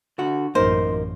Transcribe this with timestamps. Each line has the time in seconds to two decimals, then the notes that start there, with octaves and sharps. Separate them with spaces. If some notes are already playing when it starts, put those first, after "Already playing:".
0.18 D3 F#4
0.55 A1 F#2 A#3 D#4 C5